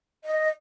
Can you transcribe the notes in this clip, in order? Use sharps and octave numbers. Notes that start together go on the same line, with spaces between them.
D#5